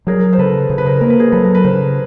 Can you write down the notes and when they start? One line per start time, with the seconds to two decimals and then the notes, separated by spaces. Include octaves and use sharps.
0.07 F#3 G#4 A#4
0.33 C5
0.38 C#3 A4 B4
0.69 C#3 C5
0.78 B4
0.86 A#4 C5
1.01 A#3 A#4
1.10 B4
1.19 G#4 A#4
1.32 F#3 A4 B4
1.44 A#4
1.55 B4
1.64 C#3 A#4 C5